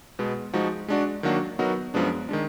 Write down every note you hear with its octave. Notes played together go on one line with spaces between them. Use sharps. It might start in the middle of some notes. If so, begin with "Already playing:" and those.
B2 G#3 B3
F3 G#3 D#4 F#4
G#3 D4 F#4 D5
D#3 F#3 A#3 D4 F#4
F#3 B3 D#4 F#4 A#4
F#2 F3 G#3 B3 D4
D#3 G#3 D4